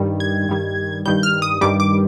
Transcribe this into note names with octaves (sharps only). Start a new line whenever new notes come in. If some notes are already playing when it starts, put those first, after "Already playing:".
Already playing: G2 D#3 G3
G#6
G2 D#3 G3
G2 D#3 G3 G6
F6
D#6
G2 D#3 G3 D6
D6